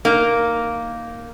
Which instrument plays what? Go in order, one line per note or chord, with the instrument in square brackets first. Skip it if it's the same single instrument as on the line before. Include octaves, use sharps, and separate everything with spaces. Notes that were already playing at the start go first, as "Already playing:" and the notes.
[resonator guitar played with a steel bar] A#3 D#4